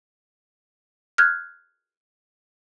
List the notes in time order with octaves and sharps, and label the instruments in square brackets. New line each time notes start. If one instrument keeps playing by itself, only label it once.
[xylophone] F6 F#6 G#6